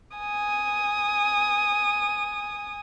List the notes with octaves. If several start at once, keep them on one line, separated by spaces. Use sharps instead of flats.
G#5 D#6